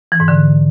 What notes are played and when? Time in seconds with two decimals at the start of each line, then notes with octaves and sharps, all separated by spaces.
0.12 E3
0.20 G#2
0.28 D3